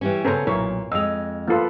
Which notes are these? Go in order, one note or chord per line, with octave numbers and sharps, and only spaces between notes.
E3 G3 C#4
C#3 B3 C#4 A4 C5 A#5
B1 A#2 E4 A#4 C#5
F2 G#3 D#5 E6 F7
F3 A#3 F4 A4 B4